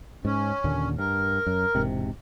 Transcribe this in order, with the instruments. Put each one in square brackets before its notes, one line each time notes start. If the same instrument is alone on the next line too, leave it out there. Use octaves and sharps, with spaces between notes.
[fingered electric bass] G#2 [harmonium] C#4
[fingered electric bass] D#2 A#2 D3
[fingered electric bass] G2 [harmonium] A#4
[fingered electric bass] F#2
E1 G#2 C3